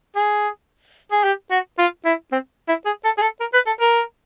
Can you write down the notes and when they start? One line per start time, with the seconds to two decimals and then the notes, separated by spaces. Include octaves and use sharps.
0.16 G#4
1.12 G#4
1.24 G4
1.51 F#4
1.78 F4
2.05 E4
2.32 C4
2.68 E4
2.86 G#4
3.04 A4
3.18 G#4
3.21 A4
3.40 A#4
3.54 B4
3.66 A4
3.81 A#4